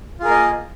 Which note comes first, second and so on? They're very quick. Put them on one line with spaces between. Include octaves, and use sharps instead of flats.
F4 G#4 A#4 A#3 D#5